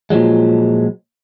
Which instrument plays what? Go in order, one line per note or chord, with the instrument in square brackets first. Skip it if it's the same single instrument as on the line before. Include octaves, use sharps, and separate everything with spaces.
[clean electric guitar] A#2 F3 F#3 G#3